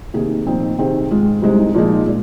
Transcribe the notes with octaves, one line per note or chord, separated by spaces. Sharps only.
C3 D#3 A#3 G#4
A#2 F3 C4 D#4
C3 D#3 C4 G#4 C5
G#2 G#3 F4
C2 C3 G#3 D#4 C5
A#2 F3 G#3 D#4 G#4
A#2 G#3